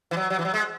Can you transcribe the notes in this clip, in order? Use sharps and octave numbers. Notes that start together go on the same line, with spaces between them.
E3
F#3
F#3
E3
F#3
G#3